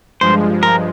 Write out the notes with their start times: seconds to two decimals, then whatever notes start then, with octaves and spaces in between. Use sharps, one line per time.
0.21 G2 F3 G#3 C5
0.63 A#4